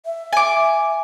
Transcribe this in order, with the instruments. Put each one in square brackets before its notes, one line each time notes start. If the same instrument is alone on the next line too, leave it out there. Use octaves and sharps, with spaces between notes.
[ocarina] E5
[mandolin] G#5 D6